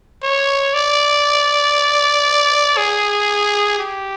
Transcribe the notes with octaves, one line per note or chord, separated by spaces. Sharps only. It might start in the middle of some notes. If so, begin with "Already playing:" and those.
C#5
D5
G#4
G4